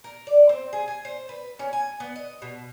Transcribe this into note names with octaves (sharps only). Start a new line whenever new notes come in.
A#4
D5
C4
G#4
G#5
C5
B4
C#4
G#5
B3
D#5
B2